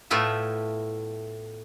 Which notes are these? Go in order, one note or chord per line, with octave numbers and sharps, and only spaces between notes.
A2 A3 B3 E4 F4 E5